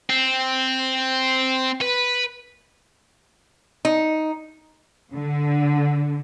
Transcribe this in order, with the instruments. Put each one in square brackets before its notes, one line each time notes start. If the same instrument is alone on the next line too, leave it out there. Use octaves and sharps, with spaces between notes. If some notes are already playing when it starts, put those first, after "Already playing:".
[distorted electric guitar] C4
B4
[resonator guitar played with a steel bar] D#4
[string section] D3